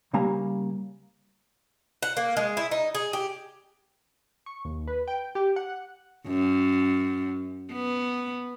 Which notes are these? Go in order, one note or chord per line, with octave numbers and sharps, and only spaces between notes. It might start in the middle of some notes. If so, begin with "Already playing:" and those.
C#3 G3 A#3 G#5 A#5
F#5
A#3
G#3
E4
D#4
G#4
G4
C#6
D#2
B4
G5
G4
F#5
F#2
B3